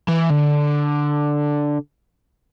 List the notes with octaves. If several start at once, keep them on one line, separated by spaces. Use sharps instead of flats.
E3
D3